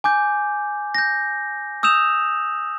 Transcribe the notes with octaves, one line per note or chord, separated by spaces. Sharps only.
G#5 D6 G6
G6 A#6
D#6 E6 G6 E7 F7